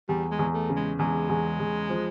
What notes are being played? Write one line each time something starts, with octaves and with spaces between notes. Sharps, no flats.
E2 G3
G#3
E2
A3
C#3
G#3
E2 G#3
E2
E2
F3